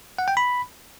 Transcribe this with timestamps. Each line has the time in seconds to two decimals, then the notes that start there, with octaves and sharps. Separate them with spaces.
0.18 F#5
0.28 G5
0.37 B5